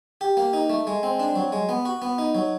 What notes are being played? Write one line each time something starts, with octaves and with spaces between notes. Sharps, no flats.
G4
A#3
D#4
A3
G#3
C4
D4
F#3
G#3
B3
F#4
B3
D#4
F#3